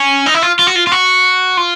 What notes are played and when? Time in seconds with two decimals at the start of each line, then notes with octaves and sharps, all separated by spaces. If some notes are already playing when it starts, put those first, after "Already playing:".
Already playing: C#4
0.26 D#4
0.34 E4
0.43 F4
0.59 F4
0.67 F#4
0.75 F4
0.87 F4
0.92 F#4
1.57 F4